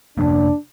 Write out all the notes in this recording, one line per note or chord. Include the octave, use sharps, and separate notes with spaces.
F2 C3 F3 A#3 D4